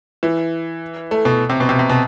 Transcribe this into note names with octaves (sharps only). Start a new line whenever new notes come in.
E3
A3
B2
C3
B2
C3
C3
B2